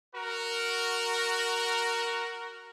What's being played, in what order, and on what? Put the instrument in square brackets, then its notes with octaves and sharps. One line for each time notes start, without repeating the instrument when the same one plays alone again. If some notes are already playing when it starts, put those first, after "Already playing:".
[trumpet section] F#4 A#4